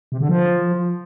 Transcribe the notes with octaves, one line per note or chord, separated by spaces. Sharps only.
C3
D3
F3